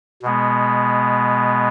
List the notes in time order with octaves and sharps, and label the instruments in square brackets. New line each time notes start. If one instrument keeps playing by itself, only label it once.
[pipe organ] B2 G#3 B3